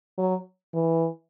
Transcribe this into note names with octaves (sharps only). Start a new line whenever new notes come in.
F#3
E3